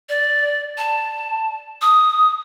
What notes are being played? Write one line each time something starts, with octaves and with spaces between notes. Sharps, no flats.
D5
A5
D#6